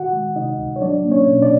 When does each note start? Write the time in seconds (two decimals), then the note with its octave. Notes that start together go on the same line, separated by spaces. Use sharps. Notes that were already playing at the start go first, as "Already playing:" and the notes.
Already playing: D#3 F#4 F#5
0.13 G#3
0.35 C3 D#4 D#5
0.58 C#2
0.76 C#5
0.81 F#3 D4 D5
1.04 A#3
1.11 C#4 C#5
1.27 B2
1.42 D4 D5